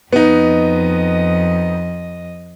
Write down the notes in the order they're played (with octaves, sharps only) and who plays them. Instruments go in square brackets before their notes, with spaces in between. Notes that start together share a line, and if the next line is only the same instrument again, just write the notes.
[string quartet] F2 D#5 [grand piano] B3 D#4